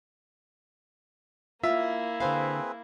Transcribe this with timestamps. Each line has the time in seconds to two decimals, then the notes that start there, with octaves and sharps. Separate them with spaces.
1.63 A#3 E4 F4 E5
2.20 D3 C4 G#4 B4 C5 F5